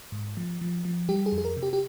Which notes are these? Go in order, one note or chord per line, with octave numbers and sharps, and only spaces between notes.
G#2
F3
F3
F3
G3 G4
G#4
F2
G#4
A#4
C3
G4
G4